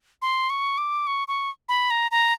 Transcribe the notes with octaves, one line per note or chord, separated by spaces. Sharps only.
C6
C#6
D6
C#6
C#6
B5
A#5
A#5